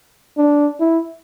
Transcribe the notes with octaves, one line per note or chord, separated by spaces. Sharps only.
D4
E4